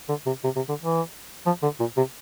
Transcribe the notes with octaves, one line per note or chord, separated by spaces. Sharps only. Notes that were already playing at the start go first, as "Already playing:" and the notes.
D3
C3
C3
C3
D3
E3
F3
D3
A#2
C3